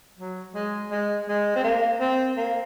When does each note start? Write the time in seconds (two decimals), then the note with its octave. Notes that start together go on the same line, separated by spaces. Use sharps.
0.18 F#3
0.55 G#3
0.91 G#3
1.29 G#3
1.56 C4
1.64 A#3
2.00 C4
2.37 A#3